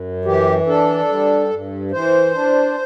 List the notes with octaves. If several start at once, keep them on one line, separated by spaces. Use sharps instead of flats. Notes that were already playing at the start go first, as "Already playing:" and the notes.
Already playing: F#2
E3 G4
D4 A4
G3
G2
E3 C5
D4